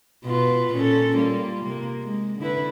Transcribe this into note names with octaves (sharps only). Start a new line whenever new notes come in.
B2 F4 B4
A#2 C#4 A4
G3 A#3 F4
C3 A#3
G#3
D3 E4 B4